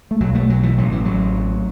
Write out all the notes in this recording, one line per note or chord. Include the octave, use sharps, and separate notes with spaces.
A3
B1 F#3
A3
B1 F#3
E3
A1 F#3
E3
A1 F#3
A2